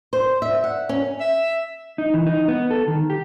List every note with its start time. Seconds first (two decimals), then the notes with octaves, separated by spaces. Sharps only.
0.13 C5
0.42 E5
0.64 F#5
0.89 C#4
1.20 E5
1.98 D#4
2.14 E3
2.26 D#4
2.48 B3
2.71 A4
2.88 D#3
3.10 G4